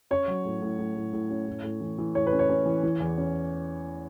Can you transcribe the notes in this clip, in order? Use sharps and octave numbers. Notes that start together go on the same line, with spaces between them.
C#4 C#5
F#3
A2
A2
A2
A2
A2
C#4
A2
A2
E3
E3
A2 C#5
B4
C#4
C#5
C#4
E3
E3
E2
C#4